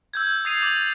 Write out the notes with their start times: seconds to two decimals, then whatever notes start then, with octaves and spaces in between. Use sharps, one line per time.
0.14 E6 G6 G#6
0.45 D#6 A6 C7 D#7 F7
0.63 D6 A6 F#7